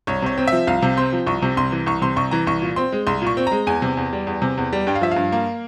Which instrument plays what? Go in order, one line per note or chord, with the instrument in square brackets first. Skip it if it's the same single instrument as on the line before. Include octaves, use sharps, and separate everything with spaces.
[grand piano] C2 C#5
C3 C#5
C4
F3 E5
C2 F5
C3
C4 C6
F3
C2 C#6
C3
C2 C6
E3
C2 C#6
C3 C6
C2 C#6
E3 A#5
C2 C#6
A#2
C4 C6
G#3
C2 C6
A#2 C#6
C4
G#3 A#5
E2 G#5
C3
E2
G3
E2
C3
E2
G3
G2 G5
F5
F3 E5
G2 F5
A#3